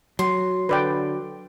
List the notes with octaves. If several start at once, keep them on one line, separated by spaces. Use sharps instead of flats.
F#3 C6
D3 B4 D5 G5